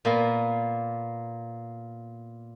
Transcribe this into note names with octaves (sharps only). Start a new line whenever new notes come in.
A#2 A#3 B3